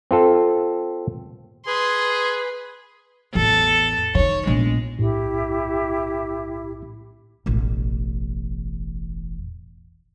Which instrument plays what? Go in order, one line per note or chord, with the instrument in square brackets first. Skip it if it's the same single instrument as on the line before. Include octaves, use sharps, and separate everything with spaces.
[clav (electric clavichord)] C4 F4 A4
[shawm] G#4 [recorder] B4 [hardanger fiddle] C6
[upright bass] A1 E2 [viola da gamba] A4
[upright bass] D3 D#3 [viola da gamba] C#5
[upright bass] A#1 B3 [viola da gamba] G#3
[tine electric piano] B1 A2 [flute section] E4 G4
[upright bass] E1 A1